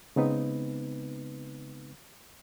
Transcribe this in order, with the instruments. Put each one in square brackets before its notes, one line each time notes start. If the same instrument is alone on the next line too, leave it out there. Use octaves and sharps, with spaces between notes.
[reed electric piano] C#3 G#3 B3 C4 D#4 B4